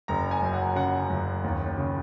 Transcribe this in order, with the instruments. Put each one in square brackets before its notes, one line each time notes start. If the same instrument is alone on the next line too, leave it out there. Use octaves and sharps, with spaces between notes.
[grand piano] F#1 A#5
G#5
F#2
F#5
C#3 F#5
F#1
D#2
C#3